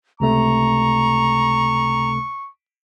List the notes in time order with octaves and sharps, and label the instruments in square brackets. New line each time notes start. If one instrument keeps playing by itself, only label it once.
[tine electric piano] C#2 C3 A3 [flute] A#5 [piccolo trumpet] C#6